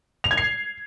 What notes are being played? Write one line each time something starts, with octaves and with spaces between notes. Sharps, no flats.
F7
G#6
C7